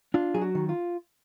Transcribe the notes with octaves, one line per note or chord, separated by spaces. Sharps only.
D4 F4
F#3 G#4
F#4
D#3
F4